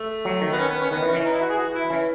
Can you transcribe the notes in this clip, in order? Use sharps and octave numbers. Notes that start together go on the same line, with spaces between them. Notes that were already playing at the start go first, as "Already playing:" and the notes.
Already playing: A3
F#3
D#3
B3
C#4
B3
C#4
D#3 B3
E3
C#4
E3
D#4
E4
F#4
G#4
F#4
E4
E3 C#4